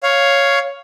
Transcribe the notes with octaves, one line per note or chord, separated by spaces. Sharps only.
C#5 F5